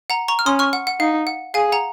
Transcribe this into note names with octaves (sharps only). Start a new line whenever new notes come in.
F#5 A#5
A#5 C#6
F6
C#4 C6 D#6
C#6 F6
F#5
F#5
D#4 F5
F#5
G#4 F5 G#5
F#5 A#5